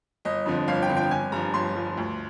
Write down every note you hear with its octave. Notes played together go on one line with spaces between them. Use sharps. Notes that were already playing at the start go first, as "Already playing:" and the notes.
G1 D#5
F2 D3 F3
G1 F5
G5
F2 D3 F3
G5
G1 G#5
G2 F3 A#5
G1 C6
G2 F3
D2